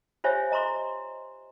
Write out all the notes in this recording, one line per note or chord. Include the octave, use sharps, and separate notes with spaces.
F4 G4 C5 C#5 E5 G#5
D#5 A#5 C6 C#6